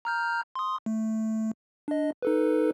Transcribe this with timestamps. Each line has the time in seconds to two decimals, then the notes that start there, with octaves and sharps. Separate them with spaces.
0.05 A#5 F6 G6
0.55 C6 D#6
0.86 A3
1.88 D4 D#5
2.22 D#4 A4 B4